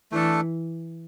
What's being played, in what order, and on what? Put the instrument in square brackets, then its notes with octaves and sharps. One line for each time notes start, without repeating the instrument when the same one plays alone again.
[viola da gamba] E3 [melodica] A3 D4 A4